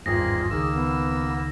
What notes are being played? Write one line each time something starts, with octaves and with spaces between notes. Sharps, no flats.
G#1 E2 G2 A#3 C4 F4 G#4 A#6
C#2 D#3 A#3 G#4 E6
B3